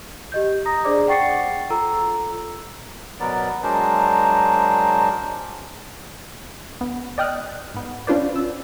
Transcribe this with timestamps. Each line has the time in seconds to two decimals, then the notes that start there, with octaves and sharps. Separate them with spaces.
0.32 G4 D#5 G6
0.66 A#5 D#6 A#6
0.84 D4 G#4 C5 D5 D6
1.08 F#5 G5 C#6 A6 C7 C#7
1.70 F4 A4 A#5 E6
3.20 B2 F#3 B3 A#4 D5
3.63 F#3 G#3 D4 A#4 C5
6.80 D2 B3
7.18 D5 D#5 G5 D#6 F6 F#6
7.74 G#2 B3
8.07 C#4 D4 F4 B4 C5 D5
8.36 E6